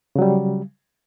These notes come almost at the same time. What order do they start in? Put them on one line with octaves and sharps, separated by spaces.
C#3 F#3 G3